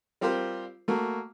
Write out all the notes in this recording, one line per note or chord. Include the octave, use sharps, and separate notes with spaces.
G3 C4 F4 G4 A#4 C5
A3 A#3 F#4